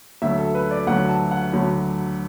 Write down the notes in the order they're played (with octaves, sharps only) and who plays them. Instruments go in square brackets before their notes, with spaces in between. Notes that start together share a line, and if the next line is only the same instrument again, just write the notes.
[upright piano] D2 D3 F#3 E5
A4
B4
D5
D2 D3 F#3 F#5
A5
F#5
D2 D3 F#3